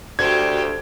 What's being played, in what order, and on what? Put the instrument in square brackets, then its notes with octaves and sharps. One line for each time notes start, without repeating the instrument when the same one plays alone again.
[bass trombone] D2 [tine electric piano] F#4 D5 [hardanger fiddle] G4 C5 [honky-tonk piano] G#6